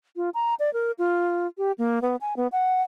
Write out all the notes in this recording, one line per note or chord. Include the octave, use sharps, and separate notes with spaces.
F4
A#5
D5
A#4
F4
G4
A#3
B3
G#5
B3
F#5